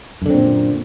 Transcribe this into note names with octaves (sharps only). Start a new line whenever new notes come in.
F#2 A#2 D3 C4